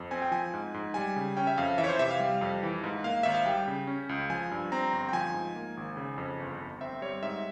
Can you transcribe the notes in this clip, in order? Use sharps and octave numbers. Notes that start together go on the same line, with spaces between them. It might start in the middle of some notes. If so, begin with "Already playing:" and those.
Already playing: F2
C4 G#5
G5
F3 G#5
G#2
G#2
G3 G#5
C#3
C#4 G5
E5
F2 F5
E3 E5
C#5
C5
C3 E5
F5
G3
F2
E3
G#2
A#3 F5
G#1 E5
F5
G3 G5
C#3
C#4
C#2
F3 G#5
G2
C4 A#5
G1
G5
F3 G#5
G#2
A#3
G#1
C#3
F2
G1
G1
C4 E5
G3 C#5
G#2 E5